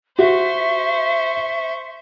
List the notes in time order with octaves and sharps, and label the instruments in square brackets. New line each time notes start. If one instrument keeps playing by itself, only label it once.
[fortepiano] F#4 [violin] C5 C#6 [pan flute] E5